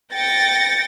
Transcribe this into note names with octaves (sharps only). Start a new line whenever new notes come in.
G5 A6 A#6 C#7